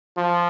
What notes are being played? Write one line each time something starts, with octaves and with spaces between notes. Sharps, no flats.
F3